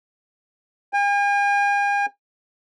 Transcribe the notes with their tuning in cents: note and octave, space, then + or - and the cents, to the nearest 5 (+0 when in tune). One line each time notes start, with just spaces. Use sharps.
G#5 -45